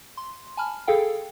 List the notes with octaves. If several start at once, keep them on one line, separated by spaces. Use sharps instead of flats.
C6
G#5 A5 B5 F6
G#4 A4 F5 G5